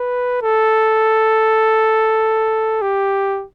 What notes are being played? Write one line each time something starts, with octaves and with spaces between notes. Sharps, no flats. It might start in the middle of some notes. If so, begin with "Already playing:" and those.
Already playing: B4
A4
G4